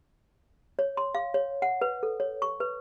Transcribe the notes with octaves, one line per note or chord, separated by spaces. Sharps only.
C#5
C6
F5
C#5
F#5
B4
A4
C#5
C#6
B4